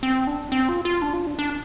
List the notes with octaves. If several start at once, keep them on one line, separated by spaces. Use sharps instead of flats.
C4
D4
C4
F4
F4
D4
F4
D4
D4